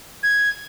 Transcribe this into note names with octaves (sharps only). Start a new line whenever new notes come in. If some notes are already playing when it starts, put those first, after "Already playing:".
G#6